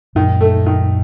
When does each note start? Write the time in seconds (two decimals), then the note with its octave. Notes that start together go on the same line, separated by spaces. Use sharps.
0.15 F#2 A#2 D#3
0.41 A3
0.66 D#3